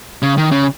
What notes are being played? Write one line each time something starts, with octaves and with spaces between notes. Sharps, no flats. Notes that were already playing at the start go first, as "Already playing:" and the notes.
C#3
D#3
C#3